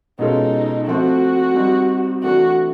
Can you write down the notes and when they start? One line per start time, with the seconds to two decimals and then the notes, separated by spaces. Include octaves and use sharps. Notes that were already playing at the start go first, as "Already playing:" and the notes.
0.19 B2 G#3 C#4 D#4 F4 A4
0.87 F3 A3 C4 F4 F#4
1.54 G3 C4 D#4
2.23 C3 E3 A3 D4 F#4